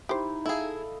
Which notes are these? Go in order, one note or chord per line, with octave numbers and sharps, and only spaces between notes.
D#4 E4 G4 C5
E4 G#4 A4 D#5 F5